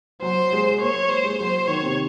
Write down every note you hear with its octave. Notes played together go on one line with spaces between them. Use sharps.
F#3 C5
G#3
A#3 C#5
C5
G#3
F#3 C5
D#3 C#5
C3